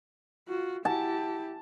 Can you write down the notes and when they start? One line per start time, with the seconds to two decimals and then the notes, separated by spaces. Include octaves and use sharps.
0.49 F4 F#4
0.85 E4 G4 A5